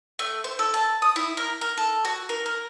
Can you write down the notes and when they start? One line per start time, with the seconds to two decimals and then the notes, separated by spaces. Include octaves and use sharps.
0.19 A3
0.44 C5
0.59 A4
0.74 A5
1.02 D#6
1.16 E4
1.37 A#4
1.61 A#4
1.78 A4
2.05 F#4
2.29 A#4
2.46 A#4